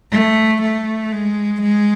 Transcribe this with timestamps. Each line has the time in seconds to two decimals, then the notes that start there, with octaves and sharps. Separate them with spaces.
0.12 A3
0.62 A3
1.12 G#3
1.62 G#3